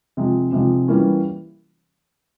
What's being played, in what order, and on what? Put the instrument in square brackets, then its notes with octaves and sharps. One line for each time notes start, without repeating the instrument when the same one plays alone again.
[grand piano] C3 F3 G#3
C3 F3 G#3
E3 G3 A#3 C#4 E4